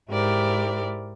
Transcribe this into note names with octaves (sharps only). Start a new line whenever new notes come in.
G#2 E4 G4 A#4 C5 D5